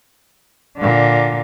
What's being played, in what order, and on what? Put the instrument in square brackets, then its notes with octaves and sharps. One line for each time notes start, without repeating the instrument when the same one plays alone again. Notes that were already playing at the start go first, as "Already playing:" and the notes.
[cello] A#2 D3